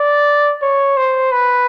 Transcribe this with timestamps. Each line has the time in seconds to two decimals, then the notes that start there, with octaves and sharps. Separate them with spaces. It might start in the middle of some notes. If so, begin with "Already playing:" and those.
Already playing: D5
0.62 C#5
0.97 C5
1.32 B4